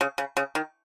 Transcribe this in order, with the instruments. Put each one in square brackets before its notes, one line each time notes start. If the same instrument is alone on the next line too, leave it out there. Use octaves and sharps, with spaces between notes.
[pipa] C#3
C#3
C#3
D#3